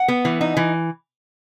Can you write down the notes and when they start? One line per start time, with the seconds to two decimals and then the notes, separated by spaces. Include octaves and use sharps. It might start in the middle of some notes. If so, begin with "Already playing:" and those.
Already playing: F#5
0.08 B3
0.25 E3
0.41 D#4
0.57 E3